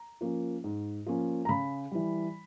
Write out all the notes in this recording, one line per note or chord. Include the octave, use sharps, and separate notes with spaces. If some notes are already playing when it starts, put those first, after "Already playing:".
Already playing: A#5
F3 A#3 C#4
G#2
F3 A#3 C#4
A#5
C#3 B5
E3 G3